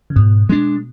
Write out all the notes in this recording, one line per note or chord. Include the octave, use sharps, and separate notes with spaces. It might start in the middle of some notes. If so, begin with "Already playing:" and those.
C#3
G#2 B2
G#3 D4